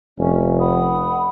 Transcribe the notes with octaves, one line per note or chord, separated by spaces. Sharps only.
F1 C#4
F#5 B5 D#6